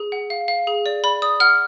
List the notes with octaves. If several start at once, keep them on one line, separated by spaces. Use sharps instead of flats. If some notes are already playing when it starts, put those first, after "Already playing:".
Already playing: G#4
F#5
F5
F5
G#4
D5
D5 B5
D5 D#6
F#5 F6